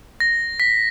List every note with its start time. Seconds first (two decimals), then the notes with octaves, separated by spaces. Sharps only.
0.20 A#6
0.60 B6